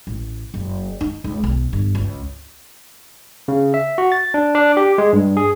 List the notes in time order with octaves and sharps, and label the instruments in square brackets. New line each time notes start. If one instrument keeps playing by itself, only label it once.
[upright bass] A1
F#1
D#4
C#2
B1
G1
C#2
[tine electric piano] C#3
E5
F#4
A6
D4
D4
G4
G#3
G2
G#4